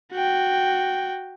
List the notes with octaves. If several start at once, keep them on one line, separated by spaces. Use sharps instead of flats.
F#4 G5